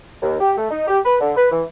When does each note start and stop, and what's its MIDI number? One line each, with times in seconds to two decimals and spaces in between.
0.22 0.37 39
0.41 0.56 67
0.57 0.71 57
0.71 0.87 63
0.88 0.99 67
1.05 1.17 71
1.21 1.34 50
1.37 1.49 71
1.52 1.64 52